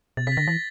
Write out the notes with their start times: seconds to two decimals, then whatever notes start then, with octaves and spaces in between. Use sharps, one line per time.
0.17 B2 A6
0.27 C3 B6
0.32 A6
0.37 D3 A#6
0.47 E3 A6